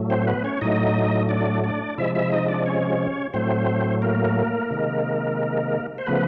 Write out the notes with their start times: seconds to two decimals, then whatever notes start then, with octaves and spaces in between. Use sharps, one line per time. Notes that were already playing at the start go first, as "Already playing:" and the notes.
Already playing: A2 F#3 A3
0.10 C4 C5
0.27 B3 B4
0.44 C#4 C#5
0.61 A2 F#3 A3 D#4 D#5
1.29 D4 D5
1.64 D4 D5
1.98 C3 F3 G#3 E4 E5
2.15 E4 E5
2.32 D#4 D#5
2.48 D4 D5
2.66 C#4 C#5
3.34 A2 F#3 A3 C4 C5
4.02 A#3 A#4
4.71 C3 D#3 G#3
5.98 C5
6.07 C#3 F3 A3 B3 B4